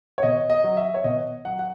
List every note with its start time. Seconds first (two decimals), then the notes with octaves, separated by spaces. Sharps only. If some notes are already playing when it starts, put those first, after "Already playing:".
0.18 C#5
0.23 B2 D#5
0.50 D#5
0.64 F#3
0.77 E5
0.94 C#5
1.04 B2 D#5
1.45 F#3 F#5
1.59 F#5